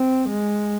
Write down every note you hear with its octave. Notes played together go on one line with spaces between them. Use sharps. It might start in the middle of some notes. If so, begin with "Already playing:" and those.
Already playing: C4
G#3